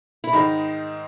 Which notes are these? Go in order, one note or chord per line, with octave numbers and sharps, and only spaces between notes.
E4
G#2 D#3 G#3 D#4